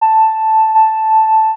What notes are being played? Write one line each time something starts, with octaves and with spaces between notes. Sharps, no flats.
A5
A5